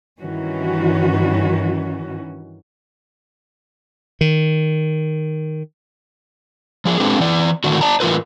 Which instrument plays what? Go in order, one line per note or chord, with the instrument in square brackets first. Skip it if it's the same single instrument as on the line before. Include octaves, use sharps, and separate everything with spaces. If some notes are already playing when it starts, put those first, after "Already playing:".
[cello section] G2 D#3 E3 C#4 F#4
[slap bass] D#3
[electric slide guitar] F3 G#4
G#3 C4 D4 G4 A4 B4
E3 D5
A2 D3 D#3 D4 F#4
D5 A5 A#5
A2 E3 B3 F4 A#4 B4